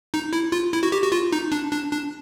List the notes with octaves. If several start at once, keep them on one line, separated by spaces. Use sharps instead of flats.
D#4
E4
F4
E4
F#4
G4
F#4
F4
D#4
D4
D4
D4